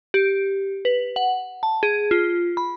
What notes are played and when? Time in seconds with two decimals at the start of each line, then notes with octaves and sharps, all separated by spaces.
0.14 G4
0.85 B4
1.16 F#5
1.63 A5
1.83 G#4
2.11 F4
2.57 B5